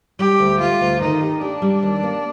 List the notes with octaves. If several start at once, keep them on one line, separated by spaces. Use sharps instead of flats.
G3 G4
D2
G3 F4
D2
D#3 D#4
G4
D4 G4
G3
D#2
A#3